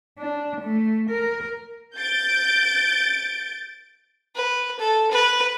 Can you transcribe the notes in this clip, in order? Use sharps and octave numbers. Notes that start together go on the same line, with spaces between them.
D4
A3
A#4
G6 A6 D7
B4
A4
B4